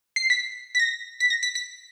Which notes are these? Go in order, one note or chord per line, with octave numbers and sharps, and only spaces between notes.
C7
B6
B6
A#6
B6
A#6
B6
B6